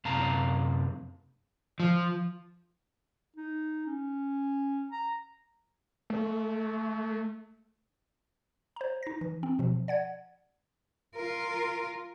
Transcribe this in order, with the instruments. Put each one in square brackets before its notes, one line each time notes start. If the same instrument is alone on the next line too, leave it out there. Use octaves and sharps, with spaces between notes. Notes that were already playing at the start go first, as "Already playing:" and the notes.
[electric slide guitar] F#2 C3 F5 A5 A#5
F3
[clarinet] D#4
C#4
A#5
[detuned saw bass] A3
[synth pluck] C5 A#5
D#4 A#6
E3
C4
B2 F3
D5 F#5 G#6
[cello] F4 A#4